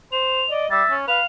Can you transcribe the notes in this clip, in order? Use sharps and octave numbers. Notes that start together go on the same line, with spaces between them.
C5 F7
D5 D#5
G3 E5 A6
C#4
B4 F5 F7